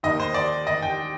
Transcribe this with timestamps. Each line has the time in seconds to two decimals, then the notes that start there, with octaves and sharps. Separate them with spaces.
0.03 D#2 D#3 D#5
0.20 C5
0.34 D5
0.67 D#5
0.82 G5